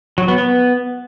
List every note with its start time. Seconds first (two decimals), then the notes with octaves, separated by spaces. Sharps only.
0.18 F#3
0.28 B3
0.38 B3